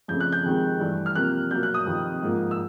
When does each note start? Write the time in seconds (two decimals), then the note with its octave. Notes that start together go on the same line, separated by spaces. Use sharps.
0.08 F2 C#3 F3 A3 G6
0.20 F#6
0.32 G6
0.44 F2 C3 D#3 G#3
0.80 G2 E3 A3
1.06 F6
1.15 C3 F3 A#3 F#6
1.51 B2 F#3 A#3 G6
1.63 F#6
1.74 D#6
1.86 F2 C3 D#3
2.22 G#2 F3 A#3
2.51 E6